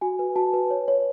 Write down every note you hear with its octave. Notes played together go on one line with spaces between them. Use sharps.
F#4 G#5
B4
F#4 A5
B4
C#5
C#5